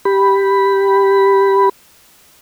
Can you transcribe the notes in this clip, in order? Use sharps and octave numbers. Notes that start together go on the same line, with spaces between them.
G4 B5